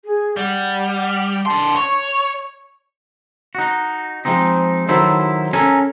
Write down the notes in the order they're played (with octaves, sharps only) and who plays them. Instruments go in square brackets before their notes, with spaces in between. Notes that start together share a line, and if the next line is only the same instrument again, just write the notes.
[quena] G#4
[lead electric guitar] G3 [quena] F#5
[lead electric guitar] D4 C6 [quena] A5
[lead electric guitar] C#5 [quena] C#6
[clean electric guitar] D#4 F#4
F3 G#3 C4 D#4
D#3 F#3 D#4 E4 A4 C5
C#4 A4 A#4 G#5